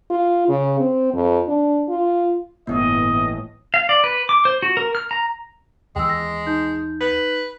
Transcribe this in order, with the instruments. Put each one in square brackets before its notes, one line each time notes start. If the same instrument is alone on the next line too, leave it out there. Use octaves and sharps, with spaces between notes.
[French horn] F4
C#3
C4
F2
D4
F4
[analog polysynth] G1 A2 E3 [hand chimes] A#3 B3 [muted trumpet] D#5
[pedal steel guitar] F5
D5
B4
D6
C5
F#4
A#4
F6
A#5
[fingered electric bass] D#2 E3 [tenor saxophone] G#3 [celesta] G5 E6
[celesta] A#6
D#4 G6
[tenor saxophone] B4